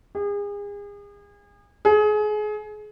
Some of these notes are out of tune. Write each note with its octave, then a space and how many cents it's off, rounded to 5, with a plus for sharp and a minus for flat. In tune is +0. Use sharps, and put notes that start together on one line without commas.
G#4 -35
G#4 +30